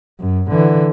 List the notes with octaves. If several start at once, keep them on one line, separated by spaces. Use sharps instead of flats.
F#2
D3 E3